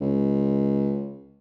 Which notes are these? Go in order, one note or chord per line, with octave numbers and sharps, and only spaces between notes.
C#2